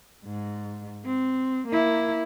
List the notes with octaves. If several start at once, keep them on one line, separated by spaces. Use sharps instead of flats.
G#2
C4
A#3 E4